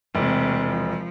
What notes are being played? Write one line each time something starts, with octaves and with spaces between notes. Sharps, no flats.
E1 C3 A3
F3